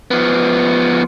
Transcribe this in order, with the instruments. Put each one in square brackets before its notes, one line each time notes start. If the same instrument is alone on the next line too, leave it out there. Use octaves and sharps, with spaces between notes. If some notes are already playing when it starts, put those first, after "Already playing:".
[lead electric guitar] F3 B3